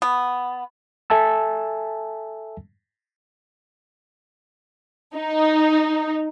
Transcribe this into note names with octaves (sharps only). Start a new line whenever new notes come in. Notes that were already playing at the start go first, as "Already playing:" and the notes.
B3
A4 E5 G#5 A5 E6
D#4